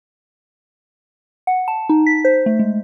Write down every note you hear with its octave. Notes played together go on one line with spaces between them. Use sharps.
F#5
A5
D#4
B6
C5
A3
G#3